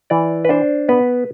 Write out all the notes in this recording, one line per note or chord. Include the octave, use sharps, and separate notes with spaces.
E3 D5
B4
D4 C5
B3 B4